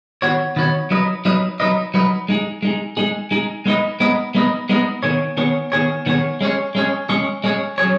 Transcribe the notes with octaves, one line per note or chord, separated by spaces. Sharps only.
D#3 B3 F#4 C#5
D#3 B3 F#4 C#5
F#3 D#4 B4 D#5
F#3 D#4 B4 D#5
F#3 D#4 B4 D#5
F#3 D#4 B4 D#5
G#3 D#4 G#4
G#3 D#4 G#4
G#3 D#4 G#4
G#3 D#4 G#4
G#3 B3 D#4 B4 D#5
G#3 B3 D#4 B4 D#5
G#3 B3 D#4 B4 D#5
G#3 B3 D#4 B4 D#5
D#3 B3 G#4 C#5
D#3 B3 G#4 C#5
D#3 B3 G#4 C#5
D#3 B3 G#4 C#5
G#3 C#4 G#4 C#5
G#3 C#4 G#4 C#5
G#3 C#4 G#4 C#5
G#3 C#4 G#4 C#5
F#3 C#4 G#4 C#5